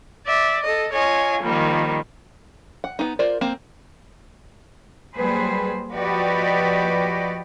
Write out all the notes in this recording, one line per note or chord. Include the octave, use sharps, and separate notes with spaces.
D5 E5
A4 D#5
F4 C#5 D#5 G#5
D#3 F3 G3 A#3
F#5
B3 D#4
F4 A#4 C5 D5
A#3 C4 C5
F#3 G3 A#3 G#4 B4 C5
F3 F#4 G4 B4 D5 D#5